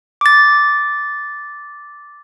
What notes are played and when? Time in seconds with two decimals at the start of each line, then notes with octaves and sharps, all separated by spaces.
0.21 D6 A6